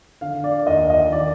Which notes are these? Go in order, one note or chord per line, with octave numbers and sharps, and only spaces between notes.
D3 F5
D5
D#2 D#5
D#5
D#3 D5